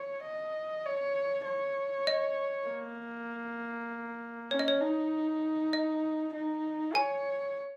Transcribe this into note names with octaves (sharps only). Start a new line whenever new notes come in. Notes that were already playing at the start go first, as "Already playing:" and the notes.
Already playing: C#5
D#5
C#5
C#5
D#5
A#3
C#4 C#5
D#5
C#5
D#4
D#5
D#4
C#5 G#5